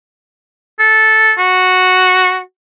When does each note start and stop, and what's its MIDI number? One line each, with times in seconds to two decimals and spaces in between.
0.79 1.33 69
1.38 2.40 66